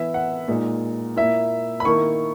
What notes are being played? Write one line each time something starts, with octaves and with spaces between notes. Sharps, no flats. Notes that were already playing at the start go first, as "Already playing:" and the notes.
Already playing: E3 B3 E4 E5
F#5
A#2 G#3 D#4
A#2 A#3 E4 E5
B5
D#3 A#3 E4 C#6